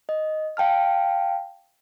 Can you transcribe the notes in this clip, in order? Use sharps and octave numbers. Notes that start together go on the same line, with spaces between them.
D#5
F5 G5 A5 F6